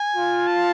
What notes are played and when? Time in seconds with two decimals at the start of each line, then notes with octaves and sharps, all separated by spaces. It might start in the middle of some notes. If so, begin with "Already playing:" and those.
Already playing: G#5
0.15 F4
0.47 A5